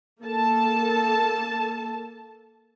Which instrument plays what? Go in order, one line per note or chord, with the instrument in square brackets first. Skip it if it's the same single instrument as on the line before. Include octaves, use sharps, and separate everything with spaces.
[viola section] A#3 A4 A5